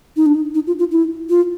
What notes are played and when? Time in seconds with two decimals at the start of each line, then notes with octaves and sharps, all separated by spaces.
0.17 D#4
0.26 D4
0.35 D#4
0.55 D#4
0.67 F4
0.79 F4
0.92 E4
1.30 F4